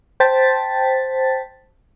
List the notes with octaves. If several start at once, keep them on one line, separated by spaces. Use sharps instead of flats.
C5 G5 A5 A6 B6